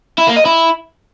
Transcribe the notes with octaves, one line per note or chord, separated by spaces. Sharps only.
E4
A#3
D#5
E4